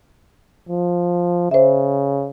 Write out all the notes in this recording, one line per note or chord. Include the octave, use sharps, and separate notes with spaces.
F3
C#3 C5 E5